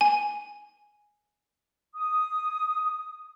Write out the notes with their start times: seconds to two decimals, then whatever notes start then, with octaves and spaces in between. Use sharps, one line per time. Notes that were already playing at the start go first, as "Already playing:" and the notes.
0.01 G#5
1.95 D#6